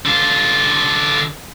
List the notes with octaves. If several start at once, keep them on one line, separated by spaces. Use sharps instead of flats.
D3 F4